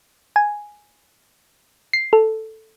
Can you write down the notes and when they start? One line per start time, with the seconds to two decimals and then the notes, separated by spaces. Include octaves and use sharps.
0.36 G#5
1.93 C7
2.13 A4